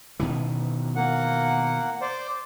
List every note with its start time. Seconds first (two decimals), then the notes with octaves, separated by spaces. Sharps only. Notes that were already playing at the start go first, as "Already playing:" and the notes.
0.20 B2 D#3 E3
0.96 A#3 F#5
2.01 C5 D5